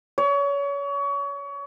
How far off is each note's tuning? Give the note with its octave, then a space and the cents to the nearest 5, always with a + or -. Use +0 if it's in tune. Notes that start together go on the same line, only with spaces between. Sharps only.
C#5 +30